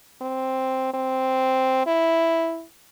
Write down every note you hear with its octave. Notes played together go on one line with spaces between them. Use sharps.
C4
C4
E4